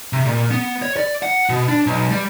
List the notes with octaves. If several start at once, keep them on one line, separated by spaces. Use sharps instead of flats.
C3
A#2
B3
C#5
D5
F#5
B2
D4
B1
G3